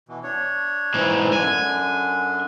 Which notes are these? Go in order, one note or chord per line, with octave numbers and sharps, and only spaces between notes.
B2 E3
D4 C#5
G#2 E3
F#2 D3 D4 G#5